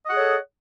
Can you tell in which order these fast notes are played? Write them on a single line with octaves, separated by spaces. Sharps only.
D#5 F#5 G#4 C#5 A4